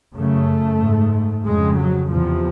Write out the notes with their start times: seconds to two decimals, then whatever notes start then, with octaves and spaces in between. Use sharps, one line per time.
0.13 F#2 C#3 A3
0.79 G#2
1.45 F2 C#3 G#3
1.78 F#3
2.10 E2 C3 F3